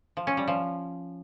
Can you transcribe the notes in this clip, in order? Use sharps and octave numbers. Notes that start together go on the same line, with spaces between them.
F3
C#4
G3
F3